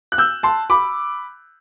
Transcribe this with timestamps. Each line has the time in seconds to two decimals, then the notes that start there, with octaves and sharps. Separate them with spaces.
0.12 F#6
0.18 E6 G6
0.43 A5 C6
0.70 B5 D6